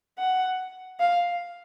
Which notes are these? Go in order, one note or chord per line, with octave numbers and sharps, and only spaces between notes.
F#5
F5